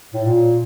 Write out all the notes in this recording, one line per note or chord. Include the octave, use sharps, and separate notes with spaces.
A2
A#2